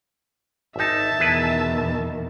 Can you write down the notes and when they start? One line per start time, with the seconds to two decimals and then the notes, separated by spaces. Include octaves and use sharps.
0.76 G#1 D#4 E5 A5
1.19 E2 B2 D#3 E4 G#4 B4